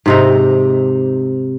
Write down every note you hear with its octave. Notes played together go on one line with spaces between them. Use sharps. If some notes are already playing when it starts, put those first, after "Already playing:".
G#2 C3 D#4